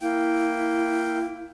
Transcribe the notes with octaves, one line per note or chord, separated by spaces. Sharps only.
A#3 E4 G5